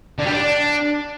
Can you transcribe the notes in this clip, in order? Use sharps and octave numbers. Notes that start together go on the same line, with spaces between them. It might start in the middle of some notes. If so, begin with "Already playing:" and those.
D3
G3
D4